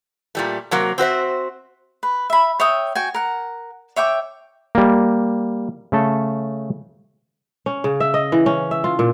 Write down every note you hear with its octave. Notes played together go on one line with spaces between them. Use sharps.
A#2 G3 A3
C3 F#3 A#3
C4 F#4 C5 E5
B4
E5 B5
C#5 E5 G5 D#6
F#4 G5 G#5
A#4 F#5
C#5 E5 G5 D6
G3 A#3
C#3 A3 A4
C#4
C#3
E5
D#5
E3
C#4
E5
F4
A#2